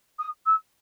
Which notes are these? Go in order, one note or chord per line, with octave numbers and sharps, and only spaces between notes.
D#6
E6